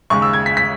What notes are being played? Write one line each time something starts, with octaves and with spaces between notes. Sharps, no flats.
D#2 C#3 G#3 C#6
E6
G#6
B6
B6